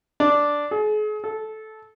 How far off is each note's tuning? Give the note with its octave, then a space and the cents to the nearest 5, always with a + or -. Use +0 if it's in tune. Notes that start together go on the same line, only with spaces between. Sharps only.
D4 -5
G#4 +40
A4 -15